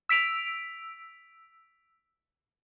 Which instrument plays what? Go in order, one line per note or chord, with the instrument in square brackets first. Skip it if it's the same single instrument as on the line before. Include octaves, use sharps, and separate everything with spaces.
[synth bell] E6 B6 D7 F7